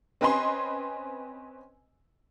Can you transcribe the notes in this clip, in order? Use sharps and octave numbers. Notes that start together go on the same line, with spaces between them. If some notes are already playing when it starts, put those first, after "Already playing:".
C4 C#4 B4 D#5 G#5 C6